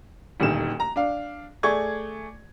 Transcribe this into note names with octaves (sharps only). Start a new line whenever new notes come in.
D#1 D2 D#3 E7
A#5
D4 F5
A3 G#4 D5 C#6 G#6